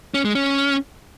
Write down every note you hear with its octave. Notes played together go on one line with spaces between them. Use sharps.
C#4
G#3
C#4